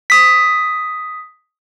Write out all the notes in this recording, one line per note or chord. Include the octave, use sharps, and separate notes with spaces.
D#6 B6